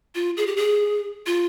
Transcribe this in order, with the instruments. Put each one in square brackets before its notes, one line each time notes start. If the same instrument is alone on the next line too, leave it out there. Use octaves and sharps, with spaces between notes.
[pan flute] F4
G#4
G4
G#4
F4